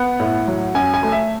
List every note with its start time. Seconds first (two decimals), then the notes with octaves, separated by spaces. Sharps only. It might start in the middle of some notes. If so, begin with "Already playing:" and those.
Already playing: B3 F#5
0.20 A2
0.48 F#3
0.75 F#2 G#5
0.94 G#5
1.03 A3
1.12 E5